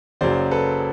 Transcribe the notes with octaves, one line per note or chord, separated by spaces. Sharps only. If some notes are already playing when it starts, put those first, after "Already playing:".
F#1 F#2 C#3 F#3 C5 D5
A4 B4